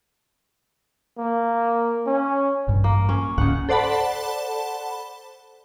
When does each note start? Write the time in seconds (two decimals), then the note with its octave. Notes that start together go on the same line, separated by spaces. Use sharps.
1.18 A#3
2.06 C#4
2.68 A1 G2
2.84 A#3
3.09 C#4
3.38 C#2 G#2 C#3 F#5
3.69 A4 C5 D5 F#5 A5 B5